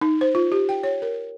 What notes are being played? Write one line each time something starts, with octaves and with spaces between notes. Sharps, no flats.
D#4
C5
F4
G4
G5
C#5
A#4